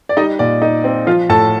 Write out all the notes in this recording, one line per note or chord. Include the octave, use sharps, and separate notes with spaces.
D5
G3 D#4 D#5
A#2 D5
D#4
C4
F3 F4 F5
A2 A4 A5